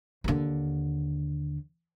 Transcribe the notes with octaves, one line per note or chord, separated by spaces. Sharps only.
D#2 D3